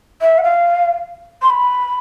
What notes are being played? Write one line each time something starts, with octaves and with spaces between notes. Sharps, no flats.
E5
F#5
F5
C6
B5